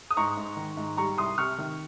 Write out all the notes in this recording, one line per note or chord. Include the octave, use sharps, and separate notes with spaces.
D#6
G#2 A#5 C#6
G#2
D#3
G#2
G3 A#5 C#6
C2 C6 D#6
C3 C#6 F6
D#3